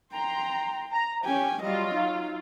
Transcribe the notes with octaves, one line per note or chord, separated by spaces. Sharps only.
G5 A#5 C6
A#5
C#4 G4 G5 G#5
F#3 G3 F4 D#5
D#4